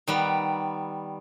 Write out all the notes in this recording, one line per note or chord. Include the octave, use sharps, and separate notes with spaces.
D#3 G3 B3